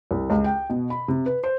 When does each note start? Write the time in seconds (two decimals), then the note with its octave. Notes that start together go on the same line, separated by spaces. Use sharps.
0.11 C2
0.30 C#2
0.44 G5
0.70 B2
0.90 B5
1.08 C3
1.26 B4
1.44 C5